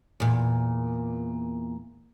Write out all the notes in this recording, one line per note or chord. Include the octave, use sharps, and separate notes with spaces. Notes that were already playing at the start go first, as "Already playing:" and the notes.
E2 A#2